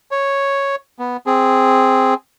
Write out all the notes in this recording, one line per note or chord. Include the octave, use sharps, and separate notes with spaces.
C#5
B3
C4 G#4